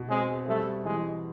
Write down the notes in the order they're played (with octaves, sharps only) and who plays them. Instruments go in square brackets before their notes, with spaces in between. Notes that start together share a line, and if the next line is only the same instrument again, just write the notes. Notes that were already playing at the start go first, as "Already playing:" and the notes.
Already playing: [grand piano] B2
[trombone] G#3 [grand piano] C4
[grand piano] G3 [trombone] A3
[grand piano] E3 [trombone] G#3